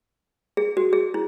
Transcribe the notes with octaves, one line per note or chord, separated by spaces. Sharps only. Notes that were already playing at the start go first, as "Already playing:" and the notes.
G#4
F#4
G#4
E4